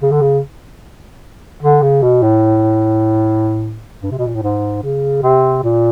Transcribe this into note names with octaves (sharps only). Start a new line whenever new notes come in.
C#3
D3
C#3
D3
C#3
B2
A2
G2
C3
B2
A#2
A2
G#2
C#3
C3
A#2